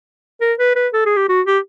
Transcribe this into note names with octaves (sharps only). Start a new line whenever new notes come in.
A#4
B4
B4
A4
G#4
G4
F#4
G4